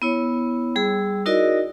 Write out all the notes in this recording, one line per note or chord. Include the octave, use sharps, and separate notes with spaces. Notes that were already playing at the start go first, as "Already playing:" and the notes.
B3 E4 C#5
G3 G#4 E6
D#4 E4 F#4 A#4 D5 D#5